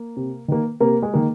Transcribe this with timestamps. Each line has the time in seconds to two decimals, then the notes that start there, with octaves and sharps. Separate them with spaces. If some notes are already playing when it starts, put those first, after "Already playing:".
Already playing: A#3
0.17 C3
0.48 D#3 A#3
0.80 C3 A#3 A#4
1.02 G#3 G#4
1.14 D#3 A#3